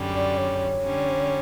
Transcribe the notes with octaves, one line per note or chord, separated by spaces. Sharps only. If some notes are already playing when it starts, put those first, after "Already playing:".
Already playing: F#2 D3 G3 C#4
D5
C#5
D3 G3 C#4